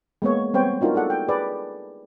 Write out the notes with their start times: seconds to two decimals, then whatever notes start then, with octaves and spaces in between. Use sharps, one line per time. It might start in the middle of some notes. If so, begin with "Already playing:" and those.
0.22 G#3 A#3 B3 C#5
0.54 G3 B3 C4 C5 C#5 G5
0.81 D4 D#4 F4 F#4 A#4
0.94 G#4 A4 D5 F#5
1.10 G5
1.28 G#4 B4 D5 A5